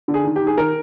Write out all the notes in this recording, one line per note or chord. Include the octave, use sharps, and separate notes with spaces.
D3
G#4
D#3
G4
D#3
G#4
D#3 A#4